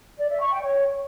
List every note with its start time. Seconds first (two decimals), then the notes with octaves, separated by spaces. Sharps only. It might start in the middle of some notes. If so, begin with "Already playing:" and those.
0.19 D5
0.30 E5
0.41 C#6
0.52 G5
0.63 C#5